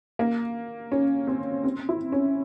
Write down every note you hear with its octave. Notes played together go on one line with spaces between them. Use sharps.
A#3
C#4
C4
C4
E4
C#4